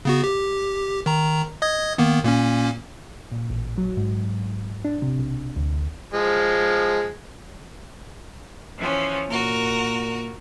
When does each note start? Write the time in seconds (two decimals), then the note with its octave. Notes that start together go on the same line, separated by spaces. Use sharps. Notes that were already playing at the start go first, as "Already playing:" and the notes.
0.05 C#3 B3 F#4
0.24 G4
1.06 D#3 A#5
1.62 D#5 D#6 G#6
1.98 D#3 A#3 B3
2.24 A#2 A#3 C#4
3.31 A#2
3.50 A1
3.78 F#3
3.97 G#2
4.85 D4
5.02 C3
5.19 B1
5.56 D2
6.14 F3 G#3
8.78 E3 F3 C#4
9.29 A#2 F#4 A#4